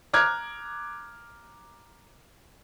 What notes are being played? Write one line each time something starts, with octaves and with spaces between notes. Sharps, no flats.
A#5 D6 F6 F#6 G#6